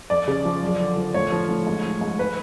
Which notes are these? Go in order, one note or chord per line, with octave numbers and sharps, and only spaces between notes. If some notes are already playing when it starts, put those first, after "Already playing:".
F2 D5
C#3
F3
F#2
D3
F3
A2 C#5
F3
A2
G#2
F3
G#2
B4